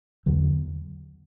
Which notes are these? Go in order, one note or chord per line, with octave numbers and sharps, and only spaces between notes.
E2 D3 F#3